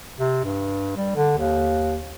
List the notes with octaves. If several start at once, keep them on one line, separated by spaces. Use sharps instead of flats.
C3
G2
G3
D3
D#2